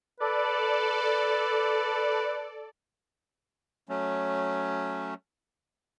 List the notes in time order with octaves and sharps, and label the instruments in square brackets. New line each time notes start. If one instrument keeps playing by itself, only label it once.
[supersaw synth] A4 D5 [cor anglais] B4
[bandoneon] F#3 A3 C#4